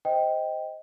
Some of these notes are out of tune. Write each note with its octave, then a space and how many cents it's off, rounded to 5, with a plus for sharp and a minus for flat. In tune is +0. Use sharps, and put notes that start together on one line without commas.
C5 -5 D#5 +10 G5 +0